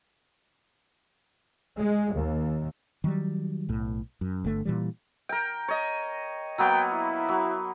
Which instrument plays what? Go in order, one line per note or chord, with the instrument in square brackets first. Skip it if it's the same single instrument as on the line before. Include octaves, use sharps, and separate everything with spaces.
[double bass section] G#3
D#2
[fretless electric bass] D#3 F#3 G3
B1 A2
F#2
G1 D3 A3
A#2 E3 G3
[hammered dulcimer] A#4 G5
C#5 D#5
[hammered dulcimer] F#3 A#3 B3 [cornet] G5
[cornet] E4
[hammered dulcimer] F#3